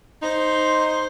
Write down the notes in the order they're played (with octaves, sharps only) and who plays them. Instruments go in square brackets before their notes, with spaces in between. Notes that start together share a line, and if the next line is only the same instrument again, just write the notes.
[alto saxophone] D#4 [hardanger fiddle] C5 C6